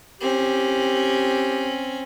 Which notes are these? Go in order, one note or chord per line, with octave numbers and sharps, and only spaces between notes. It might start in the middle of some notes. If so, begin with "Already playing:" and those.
C4 C#4 G4